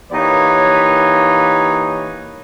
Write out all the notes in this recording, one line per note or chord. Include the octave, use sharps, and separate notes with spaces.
E3 A#3 D#4 G4 B4 C#5